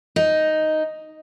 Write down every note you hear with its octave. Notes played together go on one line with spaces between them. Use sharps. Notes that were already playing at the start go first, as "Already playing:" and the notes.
D#4